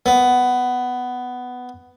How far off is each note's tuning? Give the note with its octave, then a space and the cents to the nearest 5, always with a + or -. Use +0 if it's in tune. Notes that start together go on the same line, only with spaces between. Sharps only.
B3 +10